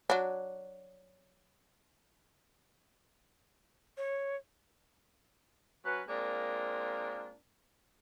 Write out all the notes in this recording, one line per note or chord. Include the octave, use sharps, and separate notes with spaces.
F#3 D4
C#5
F#3 C#4 F#4 B4
G#3 A#3 C4 D4 F4 A#4